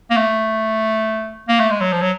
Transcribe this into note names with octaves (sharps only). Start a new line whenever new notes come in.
A#3
A3
A#3
A3
G#3
F#3
F3
F#3